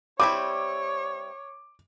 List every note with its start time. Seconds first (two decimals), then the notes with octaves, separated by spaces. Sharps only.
0.20 G3 C4 E4 C#5 D6